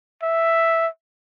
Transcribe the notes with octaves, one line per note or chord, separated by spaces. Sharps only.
E5